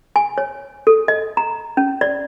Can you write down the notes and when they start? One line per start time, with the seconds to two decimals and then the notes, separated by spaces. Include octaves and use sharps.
0.16 G#5
0.38 C#5
0.87 A4
1.08 D#5
1.37 A#5
1.77 C#4
2.01 D5